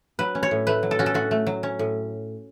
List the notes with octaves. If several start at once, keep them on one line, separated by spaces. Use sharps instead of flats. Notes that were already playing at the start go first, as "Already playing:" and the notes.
F#3 B4
C#4
C#5
A2
A3 B4
F#3
A4
C#4 F#4
A4
A2 F#4
A3
F#3
C#4
A2